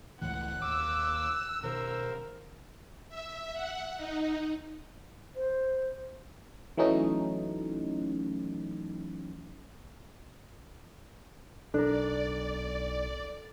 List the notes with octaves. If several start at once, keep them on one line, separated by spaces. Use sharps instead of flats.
C#2 A2 E3 F#5 F#6
D#2 D6 E6
B2 D#3 A#4 C5
E5
F#5
D#4
C5
E3 F#3 A3 C#4 D#4
B1 D4 A4 A#4 D5